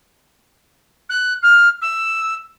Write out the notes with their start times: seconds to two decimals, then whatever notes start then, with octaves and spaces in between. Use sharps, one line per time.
1.09 F#6
1.42 F6
1.82 E6